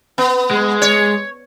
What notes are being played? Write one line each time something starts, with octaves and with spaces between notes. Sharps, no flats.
B3
G#3
C#5